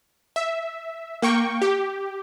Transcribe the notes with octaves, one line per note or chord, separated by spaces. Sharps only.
E5
A#3 G5 C#6
G4